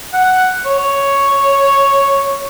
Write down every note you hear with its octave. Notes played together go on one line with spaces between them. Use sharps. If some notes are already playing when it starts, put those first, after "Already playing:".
F#5
C#5